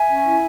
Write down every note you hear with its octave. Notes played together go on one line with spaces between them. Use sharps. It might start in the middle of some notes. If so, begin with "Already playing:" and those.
Already playing: E5 G#5
C#4
E4